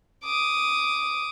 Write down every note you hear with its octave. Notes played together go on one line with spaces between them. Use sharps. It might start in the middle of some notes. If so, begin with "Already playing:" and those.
D6 D#6